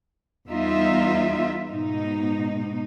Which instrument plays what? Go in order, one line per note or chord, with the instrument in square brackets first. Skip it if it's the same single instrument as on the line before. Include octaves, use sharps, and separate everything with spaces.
[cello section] E2 G3 B3 D#4 F4 E5
G#2 B2 D#4